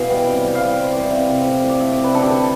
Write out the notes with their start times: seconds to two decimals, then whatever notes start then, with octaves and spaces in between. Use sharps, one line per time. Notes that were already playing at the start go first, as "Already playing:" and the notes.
Already playing: B2 E3 F5
0.10 G3 G5
0.27 C3
0.44 G3 G5
0.55 F5
0.61 G3 G5
0.78 G3 C5
0.93 E3 D5
1.02 E5
1.12 C3 F5
1.29 C3
1.46 A2
1.64 A2
1.69 D5
1.80 A3 E5
1.91 D5
1.97 C3
2.03 B4
2.14 D3 A4
2.23 G4
2.30 D3 A4